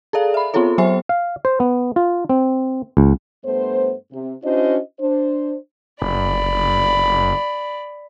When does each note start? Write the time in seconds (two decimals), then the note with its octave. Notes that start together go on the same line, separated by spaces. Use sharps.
0.13 G#4 A4 D5 F5
0.34 E5 B5
0.54 B3 C4 F4 G#4 A4 C#5
0.78 F#3 B3 C5 E5 G#5 C7
1.09 F5
1.45 C5
1.60 B3
1.96 F4
2.29 C4
2.97 C#2
3.45 G2 A3 B3 C5
4.12 C3
4.43 C#4 D4 E4 F#4 C5 D#5
4.99 D4 C5
6.02 F#1 D5 B5